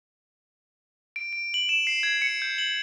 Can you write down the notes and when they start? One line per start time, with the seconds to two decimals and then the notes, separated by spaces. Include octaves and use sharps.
1.16 D7
1.33 D7
1.54 F#7
1.69 E7
1.87 C7
2.03 G#6
2.22 C#7
2.42 G6
2.58 F#7